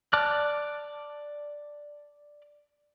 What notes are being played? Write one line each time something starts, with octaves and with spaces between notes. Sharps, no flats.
D5 A5 D6 F6 F#6